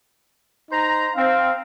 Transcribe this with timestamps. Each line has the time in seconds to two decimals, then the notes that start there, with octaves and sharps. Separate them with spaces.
0.71 D#4 C5 A#5
1.16 C4 F5